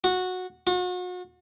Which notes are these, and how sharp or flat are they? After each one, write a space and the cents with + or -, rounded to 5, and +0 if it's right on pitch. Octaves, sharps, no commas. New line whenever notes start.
F#4 -15
F#4 -40